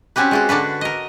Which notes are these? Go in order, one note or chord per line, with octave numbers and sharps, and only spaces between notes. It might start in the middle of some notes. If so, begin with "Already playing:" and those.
C4 C#4 F#4 G4 B4
G#3 F4 F#4
D3 D4 F#4 B4
A#4 D#5